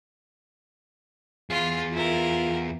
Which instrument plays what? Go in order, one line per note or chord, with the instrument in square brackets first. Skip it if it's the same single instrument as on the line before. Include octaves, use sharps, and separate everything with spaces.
[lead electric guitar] E2 G#4 [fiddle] F4
[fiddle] E4 A#4 [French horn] F4